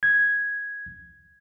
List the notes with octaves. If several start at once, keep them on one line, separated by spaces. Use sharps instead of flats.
G#6